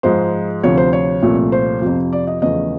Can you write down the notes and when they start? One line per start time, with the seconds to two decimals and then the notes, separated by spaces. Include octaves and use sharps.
0.03 G#2 F3 G#3 C5
0.63 D2 C3 F3 C#5
0.77 C5
0.93 C#5
1.22 C2 A#2 F3 A3
1.52 C5
1.82 F2 C3 F3
2.13 D5
2.27 D#5
2.42 E2 C#3 F3 A3 D#5